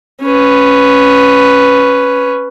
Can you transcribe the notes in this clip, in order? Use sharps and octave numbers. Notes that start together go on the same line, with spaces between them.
C#4 B4